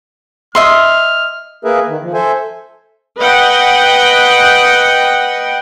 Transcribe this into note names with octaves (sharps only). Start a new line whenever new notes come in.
D#5 E5 C6 F6
A#3 G#4 A#4 B4 E5
D#3
F3
A4 C5 E5 G#5
B4 D#5 F#5 G5